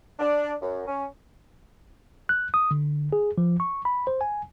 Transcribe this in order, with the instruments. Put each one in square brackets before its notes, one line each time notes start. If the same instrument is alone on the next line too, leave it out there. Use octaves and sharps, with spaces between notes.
[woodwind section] D4
F#2
C#4
[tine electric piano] F#6
D#6
D3
G#4
F3
C#6
B5
C5
G#5